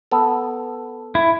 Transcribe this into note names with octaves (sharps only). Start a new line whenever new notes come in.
B3 A4
E4